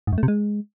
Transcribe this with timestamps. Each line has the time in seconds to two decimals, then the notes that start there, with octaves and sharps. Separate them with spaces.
0.07 G#2
0.13 F#2
0.18 A3
0.23 C3
0.28 G#3